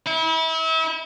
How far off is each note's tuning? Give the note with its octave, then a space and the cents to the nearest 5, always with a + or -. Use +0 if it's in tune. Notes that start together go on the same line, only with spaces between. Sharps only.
E4 -35